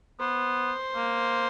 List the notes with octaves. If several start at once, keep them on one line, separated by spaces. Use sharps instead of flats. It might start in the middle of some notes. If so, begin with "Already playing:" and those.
B3 C5
A#3